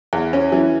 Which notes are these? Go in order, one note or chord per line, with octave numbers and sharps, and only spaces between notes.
E2
C#4
E3